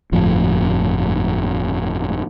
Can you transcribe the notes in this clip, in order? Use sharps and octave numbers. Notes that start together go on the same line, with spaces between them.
G1 F2 A2 F3